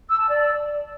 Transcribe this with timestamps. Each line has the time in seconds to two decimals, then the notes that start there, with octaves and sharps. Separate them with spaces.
0.08 E6
0.19 A5
0.29 D5